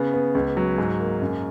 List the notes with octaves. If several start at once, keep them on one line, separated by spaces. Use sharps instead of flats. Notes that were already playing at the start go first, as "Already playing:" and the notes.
Already playing: C#3 B3
B3
C#2
F#3
G#2
A#3
F#2